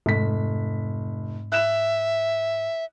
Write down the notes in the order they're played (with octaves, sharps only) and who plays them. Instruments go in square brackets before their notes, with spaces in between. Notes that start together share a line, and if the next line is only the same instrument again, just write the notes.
[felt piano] F1 B6 [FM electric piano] G#2
[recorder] E5 [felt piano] F#6 E7